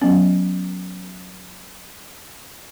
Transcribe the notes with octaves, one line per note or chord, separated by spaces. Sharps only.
F#3 B3 C#4